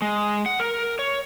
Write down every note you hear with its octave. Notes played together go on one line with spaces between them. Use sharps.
G#3
F#5
A#4
C#5